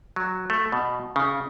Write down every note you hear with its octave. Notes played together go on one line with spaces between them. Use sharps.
F#3
A3
B2
C#3